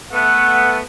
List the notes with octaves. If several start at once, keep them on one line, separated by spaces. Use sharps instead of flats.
A3 B3 F#5